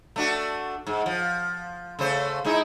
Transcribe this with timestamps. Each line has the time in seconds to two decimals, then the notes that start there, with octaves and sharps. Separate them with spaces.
0.16 A3 D4 F#4
0.87 G#2
1.06 F3
1.99 C#3 A3 C5
2.45 G#3 D#4 E4